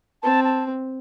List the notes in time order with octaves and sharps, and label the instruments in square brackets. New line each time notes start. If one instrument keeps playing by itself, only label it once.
[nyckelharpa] C4 [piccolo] A5
[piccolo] A5